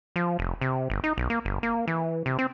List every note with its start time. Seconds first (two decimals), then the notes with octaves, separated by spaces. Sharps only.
0.16 F3
0.39 F1
0.61 C3
0.90 G1
1.04 D#4
1.18 B1
1.30 A#3
1.45 G1
1.63 A#3
1.88 E3
2.26 C3
2.39 C4